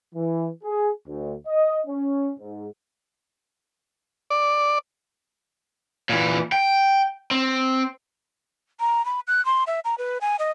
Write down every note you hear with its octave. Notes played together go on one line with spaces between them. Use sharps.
E3
G#4
D2
D#5
C#4
G#2
D5
A#2 E3
G5
C4
A#5
B5
F#6
C6
E5
A#5
B4
G#5
D#5